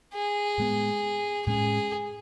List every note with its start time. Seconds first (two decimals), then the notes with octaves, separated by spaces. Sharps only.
0.14 G#4
0.58 A2 G#3 B3
1.46 A2 G#3 C#4 G#4